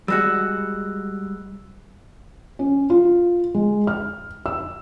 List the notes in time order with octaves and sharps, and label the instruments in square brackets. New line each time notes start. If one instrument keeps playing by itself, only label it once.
[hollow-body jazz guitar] G3 G#3 F#4 [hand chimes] E6 F#6
[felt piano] C#4
F4
G#3
F6
E6